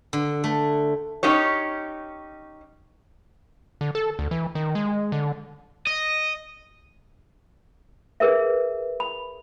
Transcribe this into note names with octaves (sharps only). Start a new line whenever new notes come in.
D3
A3
C#4 D#4 G4 C#5
D3
A4
D2
E3
D#3
G#3
D3
D#5
G#4 A#4 B4 E5
B5